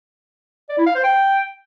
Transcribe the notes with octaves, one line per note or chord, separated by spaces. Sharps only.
D5
E4
F5
C5
G5